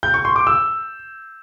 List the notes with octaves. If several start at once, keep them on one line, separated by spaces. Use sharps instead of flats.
G6
C#6
C6
D6
E6